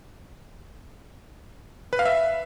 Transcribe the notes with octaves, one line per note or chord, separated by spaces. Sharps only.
B4
F5
E5